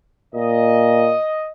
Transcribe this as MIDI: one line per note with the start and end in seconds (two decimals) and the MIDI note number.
0.35 1.13 46
0.35 1.52 75